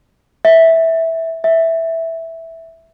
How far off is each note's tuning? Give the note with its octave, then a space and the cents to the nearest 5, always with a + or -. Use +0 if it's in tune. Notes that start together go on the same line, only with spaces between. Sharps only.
E5 -10
E5 -5